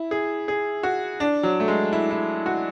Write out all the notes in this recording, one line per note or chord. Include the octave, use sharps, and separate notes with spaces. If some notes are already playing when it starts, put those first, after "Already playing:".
Already playing: E4
G#4
G#4
F#4
D4
F#3
A3
G#3
E4
E4
F#4